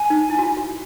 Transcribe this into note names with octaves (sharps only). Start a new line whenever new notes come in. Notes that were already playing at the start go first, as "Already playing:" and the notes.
Already playing: G#5
D#4
E4
F#4
F4
F#4